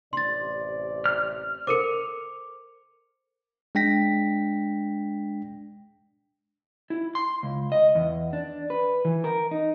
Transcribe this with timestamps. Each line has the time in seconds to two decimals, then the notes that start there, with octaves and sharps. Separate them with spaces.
0.13 A1 C3 D5 C6 A6
1.06 F6
1.67 A4 A#4 C5 D6 C#7
3.75 G#3 D4 G5 A#6 B6
6.90 E4
7.15 C6
7.43 C#2
7.72 D#5
7.95 E2
8.33 D4
8.70 B4
9.05 E3
9.24 A#4
9.51 D#4